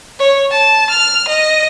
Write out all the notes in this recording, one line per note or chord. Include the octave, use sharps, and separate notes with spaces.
C#5
A5
F6
D#5